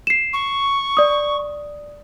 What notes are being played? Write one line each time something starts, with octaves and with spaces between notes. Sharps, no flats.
C7 E7
C#6
D5 D#6